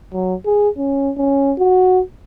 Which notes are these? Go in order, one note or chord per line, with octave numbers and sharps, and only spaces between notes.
F#3
G#4
C#4
C#4
F#4